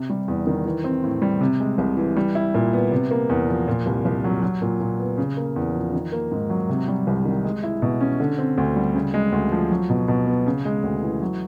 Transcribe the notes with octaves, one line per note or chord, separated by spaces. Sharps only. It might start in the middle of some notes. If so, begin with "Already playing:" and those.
Already playing: C3
G3
E2
D#3
E3
C4
A2
G3
C3
G#3
C2
E3
G3
E4
A#2
B3
C3
A#3
E2
F3
A#2
C2
C2
F#3
F#3
A#2
A#2
B3
C#3
A#3
E2
F3
D#3
A#3
G#2
F#3
C3
G3
C2
D#3
G#3
E4
B2
C#4
D3
C4
D2
G3
C#3
G#3
D2
F3
F#3
B2
B2
B3
C#3
G#3
D2
E3
F#3